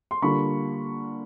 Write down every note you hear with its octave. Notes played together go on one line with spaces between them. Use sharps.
C6
D3 G3 A#3 D4 F4 B5 C#6